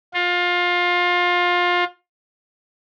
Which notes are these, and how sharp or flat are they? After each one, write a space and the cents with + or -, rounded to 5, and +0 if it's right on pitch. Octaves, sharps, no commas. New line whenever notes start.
F4 +20